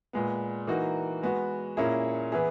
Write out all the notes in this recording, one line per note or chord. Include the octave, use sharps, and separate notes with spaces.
A#2 G#3 B3
E3 A#3 D#4 F#4
G#3 B3 F#4
A#2 A#3 C#4 E4 G#4
E3 B3 E4 G#4